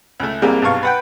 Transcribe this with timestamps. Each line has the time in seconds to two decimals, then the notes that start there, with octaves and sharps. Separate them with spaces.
0.20 C#2 A3
0.42 C2 C3 G3 G#3 A#3
0.62 B1 G2 F5 C#6
0.83 B4 F#5 G5